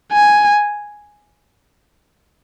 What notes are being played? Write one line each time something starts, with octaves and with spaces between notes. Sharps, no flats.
G#5